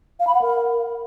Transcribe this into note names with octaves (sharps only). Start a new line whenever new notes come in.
F5
B5
F#5
A#4